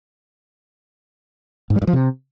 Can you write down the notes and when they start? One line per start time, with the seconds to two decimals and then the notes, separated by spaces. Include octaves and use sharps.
1.70 G#2
1.76 G3
1.82 G2
1.87 F3
1.93 C3